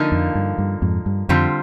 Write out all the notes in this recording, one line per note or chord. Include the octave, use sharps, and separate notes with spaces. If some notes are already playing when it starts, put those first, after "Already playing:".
Already playing: D3 F3 A#3 D#4
F2
G2
G2
F2 G#2
G2
F2 D3 G3 C4 F4